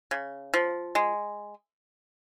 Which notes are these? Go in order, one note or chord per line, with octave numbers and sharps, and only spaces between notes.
C#3
F3
G#3